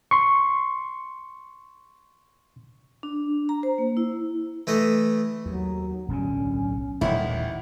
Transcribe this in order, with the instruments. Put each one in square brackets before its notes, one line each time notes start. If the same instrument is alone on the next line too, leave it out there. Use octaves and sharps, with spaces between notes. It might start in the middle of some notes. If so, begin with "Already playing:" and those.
[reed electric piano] C6 C#6
[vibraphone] D4
A#5
C5
A#3
E4
[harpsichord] E3 A3 D#5
[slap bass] D#2 [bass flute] F#3
[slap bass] D1 B1 D3 [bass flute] C#4
[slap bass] D#1 [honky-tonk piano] A1 D#3 F#5 [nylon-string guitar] E4